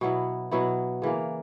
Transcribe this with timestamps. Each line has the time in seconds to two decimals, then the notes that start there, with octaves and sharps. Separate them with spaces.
0.01 B2 F#3 B3 E4
0.51 B2 F#3 B3 E4
1.02 C#3 E3 A#3